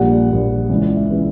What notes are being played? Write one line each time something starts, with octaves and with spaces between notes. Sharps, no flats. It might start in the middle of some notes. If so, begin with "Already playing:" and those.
Already playing: A#1 A#2 G3 F#5
A#1 A#2 G3
C#2 C#3 E3 D5
D5
E5
C#3 E3 B4